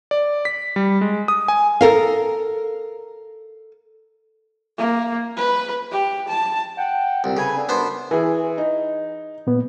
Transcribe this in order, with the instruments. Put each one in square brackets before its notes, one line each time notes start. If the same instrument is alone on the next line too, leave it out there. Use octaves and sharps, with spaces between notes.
[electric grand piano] D5
B6
G3
G#3
D#6
G#5
[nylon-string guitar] A4 A#4 F5
[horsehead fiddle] A#3
B4
G4
A5
[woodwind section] F#5 G5
[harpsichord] C2 [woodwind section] A#2 C4
[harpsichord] C#3 [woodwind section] A4 B4 G#5
[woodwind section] D3 C4
[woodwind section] F#2 G3 [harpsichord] B3 D4 C5
[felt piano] E3 G#4
D#4
[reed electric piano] A#2 B3